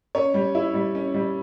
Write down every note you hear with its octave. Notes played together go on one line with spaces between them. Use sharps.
C#4 C#5
G3
E4
G3
C#4
G3